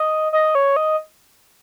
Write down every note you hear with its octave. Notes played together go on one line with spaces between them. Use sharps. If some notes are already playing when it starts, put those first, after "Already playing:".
Already playing: D#5
D#5
C#5
D#5